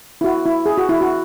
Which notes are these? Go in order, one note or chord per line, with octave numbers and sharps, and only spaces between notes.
E4
F#4
E4
G#4
F#4
E4
F#4